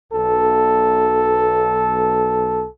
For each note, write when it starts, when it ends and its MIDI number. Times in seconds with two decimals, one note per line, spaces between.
0.12 2.67 35
0.12 2.67 69